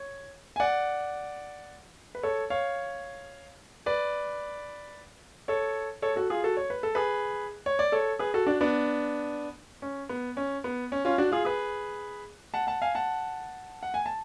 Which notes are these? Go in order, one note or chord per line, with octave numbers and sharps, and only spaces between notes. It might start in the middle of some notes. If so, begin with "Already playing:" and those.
Already playing: C#5
G#5
D5 F#5
B4
A4 C#5
C#5 F5
B4 D5
A4 C#5
A4 C#5
F#4 A4
F4 G#4
F#4 A4
C#5
B4
A4
G#4 B4
C#5
D5
A4 C#5
G#4 B4
F#4 A4
D4 F#4
B3 D4
C#4
B3
C#4
B3
C#4
C#4 F4
D4 F#4
F4 G#4
G#4 B4
F#5 A5
F#5 A5
F5 G#5
F#5 A5
F#5
G#5
A5